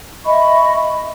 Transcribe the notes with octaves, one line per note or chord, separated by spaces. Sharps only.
D#5 E5 B5 C#6